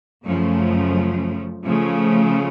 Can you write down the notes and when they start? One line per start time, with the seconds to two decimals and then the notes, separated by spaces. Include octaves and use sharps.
0.24 F#2 C#3 F3 A3
1.65 C#3 F3 A3